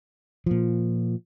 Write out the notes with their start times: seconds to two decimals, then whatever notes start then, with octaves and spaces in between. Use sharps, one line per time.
0.46 A#2 F3